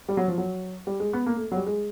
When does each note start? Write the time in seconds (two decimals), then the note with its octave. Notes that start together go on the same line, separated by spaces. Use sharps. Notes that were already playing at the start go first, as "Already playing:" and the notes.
0.08 G3
0.17 F#3
0.28 F3
0.38 F#3
0.87 G3
1.00 G#3
1.13 B3
1.26 A#3
1.37 A3
1.52 F#3
1.56 G3
1.66 G#3